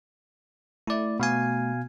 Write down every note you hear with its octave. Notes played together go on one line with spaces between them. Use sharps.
A3 E4 D5
B2 F5 G#5